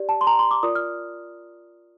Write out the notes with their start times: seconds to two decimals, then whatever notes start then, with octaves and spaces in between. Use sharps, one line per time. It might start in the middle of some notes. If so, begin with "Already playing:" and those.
Already playing: G4 D5
0.09 A5
0.21 C6
0.27 A#5
0.39 C6
0.51 D6
0.63 F4 A#4 D5 D#6
0.75 F6